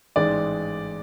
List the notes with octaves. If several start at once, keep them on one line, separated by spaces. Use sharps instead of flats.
A1 G#2 G#3 D5